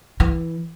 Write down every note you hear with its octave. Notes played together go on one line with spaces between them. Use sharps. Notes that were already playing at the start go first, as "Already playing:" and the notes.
E3